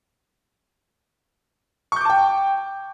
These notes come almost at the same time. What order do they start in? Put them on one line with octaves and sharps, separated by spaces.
C#6 G6 D6 A5 G5